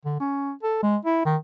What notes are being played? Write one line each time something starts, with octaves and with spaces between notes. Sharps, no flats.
D3
C#4
A4
G#3
E4
D#3